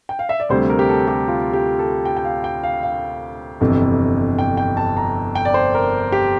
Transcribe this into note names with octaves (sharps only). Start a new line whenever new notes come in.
G5
F5
E5
D5
D2 C3 G3 C5
A#4
G4
A4
G4
F4
G4
A4
G5
G5
F5
G5
F5
F5
G1 F2 C3 E3
G5
G5
A5
A#5
G5
D5
C5
A#4
G4